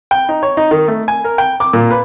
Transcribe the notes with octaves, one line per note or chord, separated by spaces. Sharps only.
G5
D#4
C#5
D#4
D#3
A3
G#5
A#4
G5
D6
A#2
B4